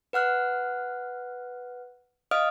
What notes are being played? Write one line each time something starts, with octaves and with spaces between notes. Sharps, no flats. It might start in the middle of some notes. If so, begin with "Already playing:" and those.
B4 F#5 F6 F#6
D#5 F5 D#6 F6 D7